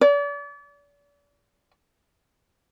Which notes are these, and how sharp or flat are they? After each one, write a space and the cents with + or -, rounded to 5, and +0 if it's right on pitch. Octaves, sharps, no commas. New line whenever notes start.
D5 -40